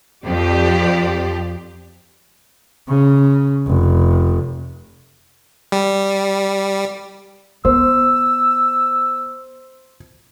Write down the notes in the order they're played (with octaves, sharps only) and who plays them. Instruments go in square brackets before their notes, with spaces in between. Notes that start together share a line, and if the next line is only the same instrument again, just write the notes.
[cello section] F2 G4 C5 D5
[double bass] C#3
F1
[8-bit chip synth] G3
[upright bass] B3 [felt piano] C5 [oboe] E6